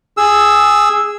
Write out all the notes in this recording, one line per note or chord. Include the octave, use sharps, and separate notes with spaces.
G#4 E6